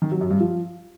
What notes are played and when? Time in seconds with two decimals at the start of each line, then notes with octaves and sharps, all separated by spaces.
0.02 D#3
0.11 F#3
0.21 F#2
0.31 G2
0.40 F3